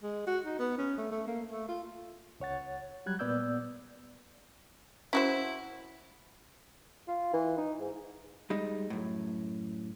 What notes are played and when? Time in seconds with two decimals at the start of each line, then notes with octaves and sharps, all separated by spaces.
0.03 G#3
0.27 F#4
0.45 D#4
0.59 B3
0.78 C#4
0.98 A3
1.11 A3
1.27 A#3
1.51 A3
1.68 F4
2.40 C#2 C#5 F#5 A6
3.06 F#3 G3 F#6 G#6
3.19 A#2 B3 D5 E6 G6
5.13 C#4 E4 F#4 C5
7.08 F4
7.34 E3
7.58 D#4
7.80 G#2
8.50 G3 G#3 D#4
8.90 F#2 A2